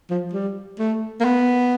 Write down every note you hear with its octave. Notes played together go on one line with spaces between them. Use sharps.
F3
G3
A3
A#3
B3